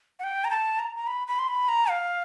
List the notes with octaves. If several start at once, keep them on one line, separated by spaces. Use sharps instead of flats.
F#5
G5
A#5
A5
A#5
A#5
B5
B5
C6
B5
A#5
F5